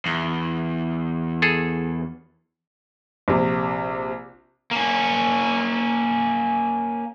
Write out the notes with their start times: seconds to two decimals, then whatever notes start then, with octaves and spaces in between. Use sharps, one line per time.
0.06 E2
1.42 G#4 A4
3.28 A#1 C3
4.71 A#3 C#4